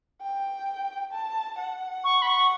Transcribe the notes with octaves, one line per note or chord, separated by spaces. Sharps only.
G5
A5
F#5
C#6
B5
C#6